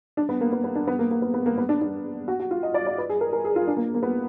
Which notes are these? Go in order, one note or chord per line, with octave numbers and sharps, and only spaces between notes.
D4
B3
A#3
B3
B3
D4
B3
A#3
A#3
B3
B3
A#3
B3
D4
D4
F#4
F#4
F4
D#5
D5
D5
B4
G#4
A#4
A#4
G#4
F4
D4
A#3
A#3
B3